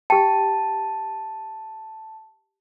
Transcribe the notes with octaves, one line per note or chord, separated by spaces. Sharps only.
G4 G5 A5